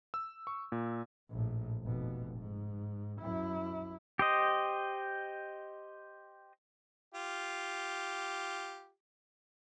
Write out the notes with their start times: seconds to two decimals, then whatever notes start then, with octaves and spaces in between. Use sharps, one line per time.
0.14 E6
0.47 C#6
0.72 A#2
1.30 A#1 A2
1.84 F1 B2
2.39 G#2
3.22 F#2 E4
4.19 G4 C5 D#5
7.14 F4 G4